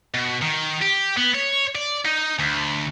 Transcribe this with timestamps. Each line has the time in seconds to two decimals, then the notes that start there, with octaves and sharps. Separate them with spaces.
0.14 B2
0.42 D#3
0.82 G4
1.17 B3
1.34 C#5
1.75 D5
2.05 D#4
2.39 D2